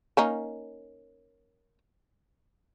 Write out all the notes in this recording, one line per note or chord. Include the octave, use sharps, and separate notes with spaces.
A#3 C#4 D#4